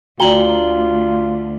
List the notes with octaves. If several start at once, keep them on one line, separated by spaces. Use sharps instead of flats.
D2 F4 F#4 D5 G5 A#5 F#7 G7